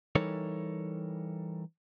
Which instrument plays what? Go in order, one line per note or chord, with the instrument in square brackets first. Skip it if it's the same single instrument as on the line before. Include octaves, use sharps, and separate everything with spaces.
[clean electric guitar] E3 G3 D#4 A4 A#4 C#5